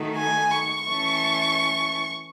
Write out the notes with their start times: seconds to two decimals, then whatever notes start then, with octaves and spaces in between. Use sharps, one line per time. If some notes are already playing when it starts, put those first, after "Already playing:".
Already playing: D#3 A3 D#4 F#4
0.17 G#5
0.51 C#6
0.85 E3 A3 C#4 C#6